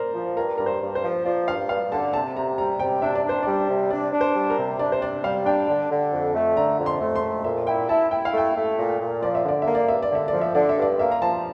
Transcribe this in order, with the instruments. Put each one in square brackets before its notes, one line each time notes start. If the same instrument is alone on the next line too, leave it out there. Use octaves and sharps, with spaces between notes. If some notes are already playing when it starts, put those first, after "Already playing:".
Already playing: [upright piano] A#4 C5 D5
[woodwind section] F3
[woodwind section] G2 [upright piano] A#4
[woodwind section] G2 [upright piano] A#4
[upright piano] C5
[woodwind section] G2
[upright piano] C5
[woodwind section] F3
[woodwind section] F3 [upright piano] D5
[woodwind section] G2 [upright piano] F5
[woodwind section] G2 [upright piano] F5
[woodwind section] D3 [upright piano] A5
[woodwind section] C3 [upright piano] A5
[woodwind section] C3 [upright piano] A#5
[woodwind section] G3 [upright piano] A#5
[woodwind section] C3 [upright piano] G5
[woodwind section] D4 [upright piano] E5
[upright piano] D5
[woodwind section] D4 [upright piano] C5
[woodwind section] G3 [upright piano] D5
[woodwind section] C3
[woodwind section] D4 [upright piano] D5
[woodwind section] D4
[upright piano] C5
[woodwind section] G3
[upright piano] A#4
[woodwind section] C3
[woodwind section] D4 [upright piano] D5
[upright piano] C5
[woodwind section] C3 [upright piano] D5
[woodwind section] G3 [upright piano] F5
[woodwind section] D4 [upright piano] G5
[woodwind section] D3
D3
F2
A3
[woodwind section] D3 [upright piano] A#5
[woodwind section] F2
[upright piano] C6
[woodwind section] A3
[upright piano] C6
[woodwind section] F2
[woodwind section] A#2 [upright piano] E5
[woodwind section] E4 [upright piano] G5
[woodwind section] E4 [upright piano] A5
[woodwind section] E4 [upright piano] G5
[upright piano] F5
[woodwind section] A3 [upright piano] G5
[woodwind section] A3
A#2
A#2
[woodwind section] F3 [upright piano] D5
[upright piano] E5
[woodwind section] D3 [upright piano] D5
[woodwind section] A#3 [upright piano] E5
[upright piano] D5
[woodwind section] G2 [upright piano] E5
[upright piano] D5
[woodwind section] D3 [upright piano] E5
[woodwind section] F3 [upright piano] D5
[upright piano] E5
[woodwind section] D3 [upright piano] D5
[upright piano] E5
[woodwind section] G2
[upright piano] D5
[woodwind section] A#3 [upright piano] E5
[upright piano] A#5
[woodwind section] F3 [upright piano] A5